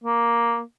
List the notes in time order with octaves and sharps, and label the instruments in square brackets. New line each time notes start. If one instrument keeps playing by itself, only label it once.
[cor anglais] A#3